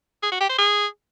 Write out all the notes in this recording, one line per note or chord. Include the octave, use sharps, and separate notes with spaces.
G#4
F#4
G4
C5
G#4